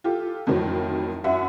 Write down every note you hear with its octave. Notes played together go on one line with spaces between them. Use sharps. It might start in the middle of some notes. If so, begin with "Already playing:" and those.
F4 G4 A4
F2 A2 D#3 F#3
F#2 E5 F#5